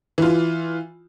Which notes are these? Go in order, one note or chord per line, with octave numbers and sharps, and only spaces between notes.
E3 F4